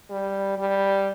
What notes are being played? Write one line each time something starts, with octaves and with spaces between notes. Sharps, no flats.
G3
G3